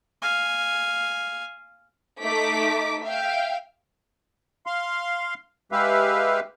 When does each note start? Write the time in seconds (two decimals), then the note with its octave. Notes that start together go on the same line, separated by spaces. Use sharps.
0.22 F5 G#5
2.23 A3 D#4 D6 B6
3.03 E5 F5 G5
4.66 F5 C6
5.72 G#3 G4 B4 E5 F5